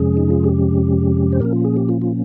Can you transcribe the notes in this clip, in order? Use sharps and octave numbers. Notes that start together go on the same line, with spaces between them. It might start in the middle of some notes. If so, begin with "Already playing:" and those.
Already playing: F2 C3 F3 G#3 C#4 G#4
D#4
F4
G4
C5
A#2 F3 A#3 C#4 A#4
F4
G#4
G4
F4
F4